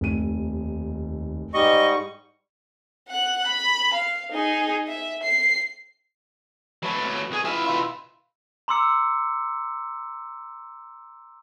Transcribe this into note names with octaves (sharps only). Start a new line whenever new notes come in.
F1 D#2 D#7
G#2 G3 D#5 C#6
F#5 F#6
B5
F5
D#4 G#4
E5
C7
F#3 A3 B4 C#5
C2 G#4
E4 F4 E5 F5 G#5
B2 E4 F4 E5
A#5 C6 D6 E6 C#7